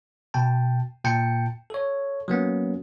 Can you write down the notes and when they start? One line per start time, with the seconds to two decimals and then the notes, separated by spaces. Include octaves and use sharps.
0.34 B2 G5 A5
1.04 A#2 G5 A5 C#7
1.70 A4 C#5
2.28 F#3 A#3 B3 C#4